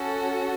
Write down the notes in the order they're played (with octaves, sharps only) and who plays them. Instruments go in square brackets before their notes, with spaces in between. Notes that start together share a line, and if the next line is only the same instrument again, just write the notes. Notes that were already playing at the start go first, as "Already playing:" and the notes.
Already playing: [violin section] C#4 F#4 A4